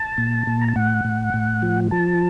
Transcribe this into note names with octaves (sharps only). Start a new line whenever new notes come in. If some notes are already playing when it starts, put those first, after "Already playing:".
Already playing: A5
A#2
A#2
A#5
A5
A2 F#5
A2
A2
F3
F3 A5